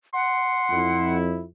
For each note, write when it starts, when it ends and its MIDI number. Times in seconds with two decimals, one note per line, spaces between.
0.14 1.17 78
0.14 1.14 84
0.70 1.43 41
0.70 1.43 64